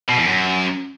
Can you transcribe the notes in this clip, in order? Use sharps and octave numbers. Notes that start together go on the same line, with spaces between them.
B2
E2
F#2